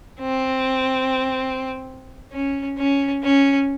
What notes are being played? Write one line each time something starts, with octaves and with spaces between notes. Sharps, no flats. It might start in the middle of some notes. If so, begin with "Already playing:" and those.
C4
C#4
C#4
C#4